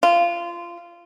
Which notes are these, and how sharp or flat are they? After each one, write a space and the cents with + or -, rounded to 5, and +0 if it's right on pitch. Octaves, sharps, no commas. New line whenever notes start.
F4 -20